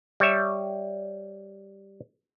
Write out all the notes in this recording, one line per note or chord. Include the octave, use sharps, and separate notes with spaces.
G3 C#5 E5